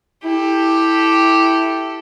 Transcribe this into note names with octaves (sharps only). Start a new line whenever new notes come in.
E4 G4 A4